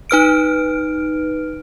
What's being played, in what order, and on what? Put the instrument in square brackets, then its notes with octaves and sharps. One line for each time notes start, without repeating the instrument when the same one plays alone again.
[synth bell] D#4 B4 F6 D7